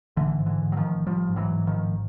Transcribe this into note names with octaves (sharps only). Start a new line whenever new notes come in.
A1 D3 E3
G#2
D3 E3
G#2
F#3
D#3 F3
A1
A1 F3 G3
G#2
E3 F#3
G#2
D#3 F3
A1